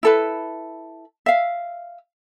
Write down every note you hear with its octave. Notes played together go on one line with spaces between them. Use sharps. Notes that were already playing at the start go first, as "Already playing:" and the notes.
E4 A4 B4
E5 F5